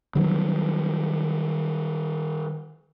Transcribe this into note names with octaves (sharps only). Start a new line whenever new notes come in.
D#3 F#3 G3